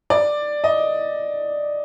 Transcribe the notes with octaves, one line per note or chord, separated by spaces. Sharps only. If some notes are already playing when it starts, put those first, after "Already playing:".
D5
D#5